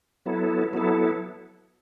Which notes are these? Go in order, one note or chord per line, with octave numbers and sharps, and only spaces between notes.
F#3 B3 E4 A4
F#3 B3 E4 A4